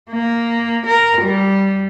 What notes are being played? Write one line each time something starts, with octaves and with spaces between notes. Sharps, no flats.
A#3
A#4
G3